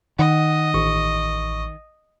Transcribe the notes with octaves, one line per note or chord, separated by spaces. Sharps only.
D#3 D#5 F#5
A1 C#6